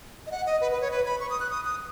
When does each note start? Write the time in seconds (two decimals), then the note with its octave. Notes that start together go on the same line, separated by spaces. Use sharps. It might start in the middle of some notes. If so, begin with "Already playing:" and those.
0.27 D#5
0.31 F#5
0.46 D#5
0.61 B4
0.72 B4
0.81 C#5
0.91 B4
1.06 B5
1.20 C#6
1.30 D#6
1.40 F#6
1.50 D#6
1.65 D#6